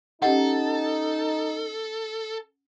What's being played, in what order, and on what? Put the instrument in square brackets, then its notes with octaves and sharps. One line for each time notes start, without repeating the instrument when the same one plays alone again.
[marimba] C#4 G4 D#5 [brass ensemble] D#4 [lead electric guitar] A4 [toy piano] F#5